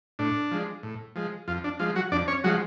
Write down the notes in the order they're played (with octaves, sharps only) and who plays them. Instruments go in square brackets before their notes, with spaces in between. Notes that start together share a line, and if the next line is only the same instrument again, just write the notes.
[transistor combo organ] A2 D4
F3 G#3
A2
F3 G#3
F2 F4
D4
F3 G#3 F4
F#3 F#4
F2 D4 D5
C#4 C#5
F3 F#3 G#3 F#4